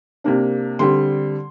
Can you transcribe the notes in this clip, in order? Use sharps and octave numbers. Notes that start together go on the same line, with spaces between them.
C3 A#3 D4
D3 G3 C4 C6